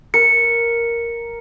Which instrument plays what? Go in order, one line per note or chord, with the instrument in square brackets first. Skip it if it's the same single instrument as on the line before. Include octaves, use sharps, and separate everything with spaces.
[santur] A#4 [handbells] C#7